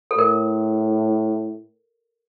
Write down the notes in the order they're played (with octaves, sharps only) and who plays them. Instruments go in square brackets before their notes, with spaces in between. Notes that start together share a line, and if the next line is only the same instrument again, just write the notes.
[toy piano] A4
[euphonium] A2 [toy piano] A#4